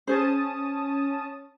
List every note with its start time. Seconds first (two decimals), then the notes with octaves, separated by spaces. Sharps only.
0.07 C#4 G#4 C5 A5 D#6